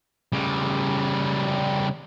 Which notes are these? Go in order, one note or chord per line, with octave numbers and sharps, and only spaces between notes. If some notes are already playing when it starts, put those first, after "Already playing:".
C#3 G3